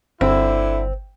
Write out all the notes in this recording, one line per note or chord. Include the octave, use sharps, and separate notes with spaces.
G1 D3 C4 E4